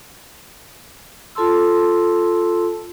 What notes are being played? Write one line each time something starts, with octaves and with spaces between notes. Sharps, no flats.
F4 A4 A5 C6 E6